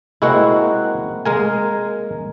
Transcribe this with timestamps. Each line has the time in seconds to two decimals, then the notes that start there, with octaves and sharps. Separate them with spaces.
0.22 G#3 A#3 C4 E4 F#4 F#5
1.26 G#3 A#3 A#4 G#5